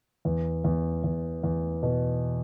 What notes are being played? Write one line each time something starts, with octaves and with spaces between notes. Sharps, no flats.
E2
E2
E2
E2
B2